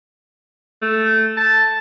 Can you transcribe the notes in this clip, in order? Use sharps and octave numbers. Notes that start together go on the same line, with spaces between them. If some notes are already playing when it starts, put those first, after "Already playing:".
A3
A5